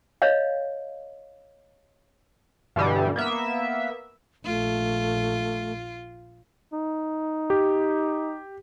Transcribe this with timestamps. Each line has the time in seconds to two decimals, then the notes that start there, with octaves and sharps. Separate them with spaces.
0.22 C#5 D#5 F5
2.76 G2 B2 D3 E3 G3
3.16 A#3 B3 E5
4.45 A#1 A3 F4
6.73 D#4
7.50 G4